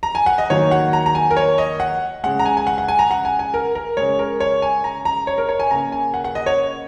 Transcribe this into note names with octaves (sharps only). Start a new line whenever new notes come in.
A#5
G#5
F#5
D#5
D#3 F#3 A#3 C#5
F#5
A#5
A#5
G#5
A#4
C#5
D#5
F#5
C#3 G#3 F#5
A#5
G#5
G#5
F#5
F#5
G#5
A#5
F#5
G#5
G#5
A#4
A#4
C#3 G#3 C#5
A#4
C#5
G#5
A#5
A#5
C#5
A#4
C#5
G#5
C#3 A#3 A#5
G#5
F#5
F#5
D#5
C#5